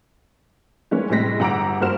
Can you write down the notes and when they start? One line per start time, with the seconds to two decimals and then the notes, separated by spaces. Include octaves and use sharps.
0.91 E3 G3 G#3 A#3 C#4
1.10 A2 C3 G3 G#3 A#6 B6
1.40 G1 F#5 A#5 D6 E6 D7
1.81 G2 A#3 F#4 C5 F6 E7